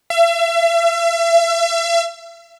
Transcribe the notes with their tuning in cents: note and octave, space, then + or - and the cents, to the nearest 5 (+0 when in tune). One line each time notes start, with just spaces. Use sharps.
E5 +40